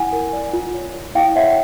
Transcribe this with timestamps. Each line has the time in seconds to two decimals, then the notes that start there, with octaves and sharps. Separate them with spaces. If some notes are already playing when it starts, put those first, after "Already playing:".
Already playing: E4 F#5 G#5
0.12 A#4
0.33 D5
0.53 F4
0.74 C#5
0.94 F4
1.15 E4 F5 G5
1.36 C#5 E5 F#5